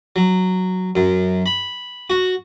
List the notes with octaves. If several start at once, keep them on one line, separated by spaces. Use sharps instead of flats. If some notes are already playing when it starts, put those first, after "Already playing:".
F#3
F#2
B5
F#4